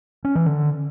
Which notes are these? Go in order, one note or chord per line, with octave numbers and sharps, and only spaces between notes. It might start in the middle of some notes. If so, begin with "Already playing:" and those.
C#4
E3
D3